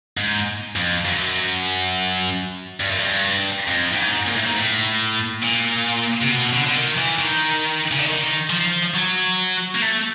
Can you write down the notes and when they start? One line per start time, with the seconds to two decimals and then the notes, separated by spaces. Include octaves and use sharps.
0.17 G#2
0.76 F2
1.05 F#2
2.80 G2
2.90 F#2
2.99 G2
3.68 F2
3.93 A2
3.98 G#2
4.27 A#2
4.36 A2
4.46 G#2
4.55 A2
5.43 A#2
6.21 C3
6.31 B2
6.53 D3
6.66 D3
6.76 D#3
6.97 E3
7.19 D#3
7.92 C#3
7.99 D3
8.06 D#3
8.50 F3
8.94 F#3
9.75 A#3
9.82 A3